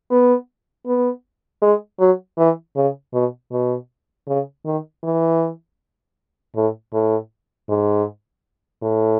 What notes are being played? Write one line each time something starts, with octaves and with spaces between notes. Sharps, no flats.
B3
B3
G#3
F#3
E3
C#3
B2
B2
C#3
D#3
E3
A2
A2
G#2
A2